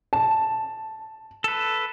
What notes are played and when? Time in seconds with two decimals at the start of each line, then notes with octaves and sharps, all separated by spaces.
0.13 A5
1.44 A4 B4